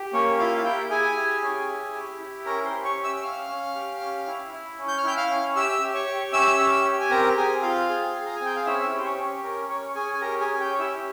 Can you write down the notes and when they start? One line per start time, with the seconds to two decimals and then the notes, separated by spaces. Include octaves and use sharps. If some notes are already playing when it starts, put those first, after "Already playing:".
Already playing: G4
0.13 A#3 C#4 C#5
0.39 E4 F4 F5
0.57 F5
0.64 E4 G4 G5
0.90 E4 G#4 G#5
1.17 G4
1.42 C#4
1.68 E4
1.94 G4
2.20 E4
2.46 C#4 A#4 A#5
2.65 C5 C6
2.71 G4
2.85 C#5 C#6
2.98 C#4
3.04 E5 E6
3.16 E6
3.23 C#4 F5 F6
3.49 C#4
3.75 G4
4.01 C#4
4.27 E4
4.53 E4
4.79 C#4
4.88 G6
4.98 F6
5.04 E4 G5 G6
5.17 F5 F6
5.30 C#4
5.56 G4 E5 E6
5.81 G4
5.94 C#5 C#6
6.07 G4
6.33 C#4 E5 E6
6.59 G4
6.85 G4
7.00 G#5
7.11 C4 A#4 A#5
7.37 C4 G#4 G#5
7.62 F4 F5
7.89 G#4
8.14 G#4
8.26 A#5
8.36 C4 G#5
8.46 G5
8.56 F5
8.66 C#4 E4 E5
8.92 G4
8.98 C5
9.05 C#4 C#5
9.18 C#4
9.43 C#4 A#4
9.69 C#4 C#5
9.95 C#4 G#4 G#5
10.14 G#5
10.21 G4 A#4 A#5
10.41 G#4 G#5
10.47 C#4
10.53 G#5
10.60 G4 G5
10.73 G4 C#5
10.79 E4 E5